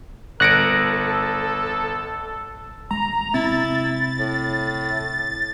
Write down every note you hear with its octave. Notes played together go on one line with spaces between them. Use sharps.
G1 A4 F#6 A#6 C#7 D7
D#1 G#3 A#5
C3 C4 E4 A6
A2